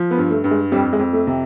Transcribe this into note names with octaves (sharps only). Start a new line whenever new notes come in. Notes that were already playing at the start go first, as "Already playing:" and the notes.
Already playing: F3
B3
G2
A3
G2
G#3
F2 G3
G#3
F2
A3
C3